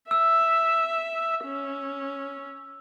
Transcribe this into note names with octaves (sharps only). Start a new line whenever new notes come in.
E5 E6
C#4